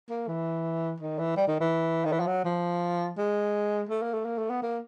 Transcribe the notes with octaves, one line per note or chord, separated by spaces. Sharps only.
A#3
E3
D#3
E3
G3
D#3
E3
D#3
E3
F3
F#3
F3
G#3
A3
A#3
A3
A#3
A3
B3
A#3